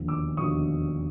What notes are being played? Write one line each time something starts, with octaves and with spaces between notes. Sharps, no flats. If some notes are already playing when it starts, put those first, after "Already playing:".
Already playing: E1 D#2 D3 F3
D6 E6
E1 D#2 D3 F3 C#6 D#6